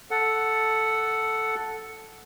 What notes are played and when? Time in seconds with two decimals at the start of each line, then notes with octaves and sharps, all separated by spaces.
0.11 A4 F#5